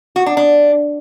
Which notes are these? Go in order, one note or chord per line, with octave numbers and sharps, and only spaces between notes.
F#4
D4
D4